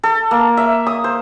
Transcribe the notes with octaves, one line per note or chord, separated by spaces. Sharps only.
A4
A#3
E5
D#6
C5